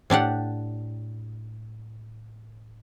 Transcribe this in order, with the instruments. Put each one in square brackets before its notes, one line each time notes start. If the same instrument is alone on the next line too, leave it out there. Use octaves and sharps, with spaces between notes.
[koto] A2 D4 G4 F#5